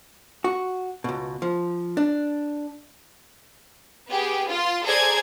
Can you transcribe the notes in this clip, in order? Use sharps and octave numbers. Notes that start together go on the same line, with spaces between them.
F#4
C#2 B2
F3
D4
B3 G4 G#4 G5
F4 F5 C6
G#4 A4 C5 D5 A#5 G#6